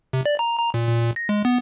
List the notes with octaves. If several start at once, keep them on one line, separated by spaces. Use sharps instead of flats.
C3
D5
A#5
A#5
A#2
A#2
A#2
A#6
G#3
B3